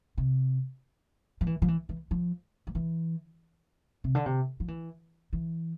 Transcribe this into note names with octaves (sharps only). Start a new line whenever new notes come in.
C3
F3
E3
F3
E3
E3
F3
F3
E3
C3
D3
C3
F3
E3
E3